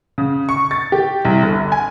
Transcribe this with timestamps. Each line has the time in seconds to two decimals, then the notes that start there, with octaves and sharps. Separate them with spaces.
0.18 C#3
0.49 C#6
0.71 A6
0.92 G4
1.25 C2
1.42 G1
1.72 G#5